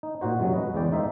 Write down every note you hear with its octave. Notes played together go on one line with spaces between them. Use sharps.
D#4
A#2 D#4 F#4 C5
F#2 C3 F#3 G#3 C#4
B4 D#5
E2 C#3 G#3 C#4 D5 G5
D#4 A#4 C5 E5 F5